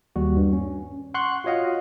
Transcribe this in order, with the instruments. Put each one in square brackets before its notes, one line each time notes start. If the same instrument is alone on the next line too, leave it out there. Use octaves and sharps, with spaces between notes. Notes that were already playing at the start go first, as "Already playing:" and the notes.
[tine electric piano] D#2 G3 F#4
G2
C#4
F#5 C6 C#6 F#6
F4 F#4 C#5 D#5 F5 F#5